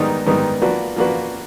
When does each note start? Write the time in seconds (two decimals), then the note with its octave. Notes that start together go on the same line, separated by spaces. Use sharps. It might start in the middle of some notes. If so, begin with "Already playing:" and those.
Already playing: G#2 D#3 G3 B3 D#4
0.26 G#2 D#3 G3 B3 D#4
0.61 F3 A#3 D4 F#4 B4
0.96 F3 A#3 D4 F#4 B4